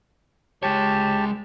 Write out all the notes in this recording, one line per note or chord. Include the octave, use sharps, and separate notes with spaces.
G#3 G4 C#5 A5